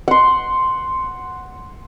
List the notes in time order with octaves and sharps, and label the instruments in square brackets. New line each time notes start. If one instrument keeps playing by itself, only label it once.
[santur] F#5 C6